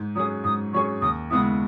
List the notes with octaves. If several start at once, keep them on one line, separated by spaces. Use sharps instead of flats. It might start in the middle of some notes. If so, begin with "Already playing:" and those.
Already playing: G#2
F#3 C#4 G#4 D#6
G#2 D#6
F#3 C#4 G#4 C#6
D#2 D#6
C#3 G#3 B3 E4 D#6